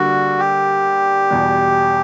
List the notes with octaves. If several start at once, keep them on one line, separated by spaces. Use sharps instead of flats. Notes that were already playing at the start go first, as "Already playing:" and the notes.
Already playing: D3 G3 A#3 D4 F#4
G4
E2 B2 G3